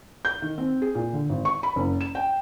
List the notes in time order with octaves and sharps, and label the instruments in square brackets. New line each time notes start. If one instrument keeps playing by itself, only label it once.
[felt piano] G6
D#3
C4
G#4
A#2
D3
G#1
C#6
B5
F#1
E7
G5